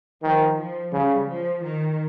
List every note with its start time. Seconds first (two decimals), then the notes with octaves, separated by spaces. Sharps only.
0.23 D#3 F3
0.58 F3
0.93 C#3 G3
1.28 F3
1.64 D#3